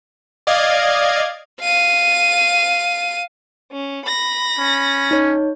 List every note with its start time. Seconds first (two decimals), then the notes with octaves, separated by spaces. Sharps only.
0.47 D5 D#5 F5 G#6
1.61 F5 D#7
3.72 C#4
4.05 B5 A#6
4.58 C#4
5.11 D#4 C#5